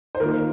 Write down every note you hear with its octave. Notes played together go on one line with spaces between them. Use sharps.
C5
D#3 A#3 F4 A#4